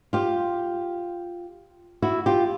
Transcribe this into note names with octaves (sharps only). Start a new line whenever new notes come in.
F4 G4
E4 F#4
F4 G4